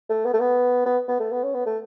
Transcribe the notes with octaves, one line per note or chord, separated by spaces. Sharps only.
A3
B3
A3
B3
B3
B3
A3
B3
C#4
B3
A3